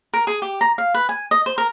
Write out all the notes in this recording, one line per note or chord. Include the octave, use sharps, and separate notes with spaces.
A#4
G#4
G4
A#5
F5
B4
G#5
D#5
C5
A#4